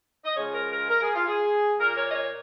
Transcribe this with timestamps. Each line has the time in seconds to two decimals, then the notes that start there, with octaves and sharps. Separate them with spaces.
0.25 D#5
0.36 C#3 F3 G#3 C#5
0.53 A#4
0.71 A#4
0.89 A#4
1.02 G#4
1.15 F4
1.27 G#4
1.79 A#2 A#3 A#4
1.96 C#5
2.08 D#5
2.14 C#5